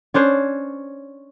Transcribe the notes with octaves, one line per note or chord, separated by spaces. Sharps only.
C#4 D4 C5 C#5